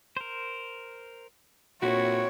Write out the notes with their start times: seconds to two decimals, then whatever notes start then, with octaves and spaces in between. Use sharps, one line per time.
0.17 A#4 C5
1.83 A#2 C4 E4 F#4 C#5